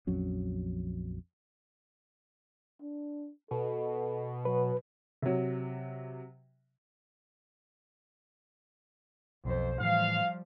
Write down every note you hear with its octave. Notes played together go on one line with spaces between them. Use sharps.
A#1 F2 F#3 C#4
D4
B2 A4
F#3 B4
C3 F#3
B1 F2 C5
A2 E3 F3 G3 F5